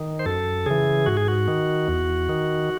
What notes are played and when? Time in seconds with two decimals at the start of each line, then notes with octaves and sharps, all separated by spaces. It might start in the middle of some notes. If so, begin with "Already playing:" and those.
Already playing: D#3
0.19 C5
0.26 F#2 A4
0.66 C#3 E3 G#4
1.06 G#2 F#4
1.17 G#4
1.28 F#4
1.48 D#3
1.88 E2
2.29 D#3